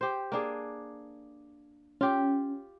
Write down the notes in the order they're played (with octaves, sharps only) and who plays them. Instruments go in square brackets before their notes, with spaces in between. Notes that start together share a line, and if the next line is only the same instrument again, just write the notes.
[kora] G4 C5
A#3 D4 G#4
[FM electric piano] C#4 [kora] F4 G4